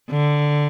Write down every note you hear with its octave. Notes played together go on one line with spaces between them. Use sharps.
D3